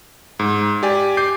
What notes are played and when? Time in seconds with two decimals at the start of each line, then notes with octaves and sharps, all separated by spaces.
0.39 G#2
0.83 G4 D5 G#5
1.17 D6 G6 C7